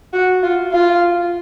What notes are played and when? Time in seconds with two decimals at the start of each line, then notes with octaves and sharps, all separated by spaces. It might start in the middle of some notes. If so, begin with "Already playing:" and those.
0.13 F#4
0.43 F4
0.72 F4